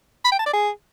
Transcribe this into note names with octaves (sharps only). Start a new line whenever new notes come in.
B5
G5
A5
D5
G#4